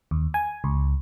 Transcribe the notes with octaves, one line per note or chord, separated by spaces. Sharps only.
D#2
G#5
C#2